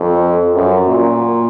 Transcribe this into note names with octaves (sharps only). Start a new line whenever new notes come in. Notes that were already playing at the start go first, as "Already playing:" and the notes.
Already playing: F2
F#2
A#2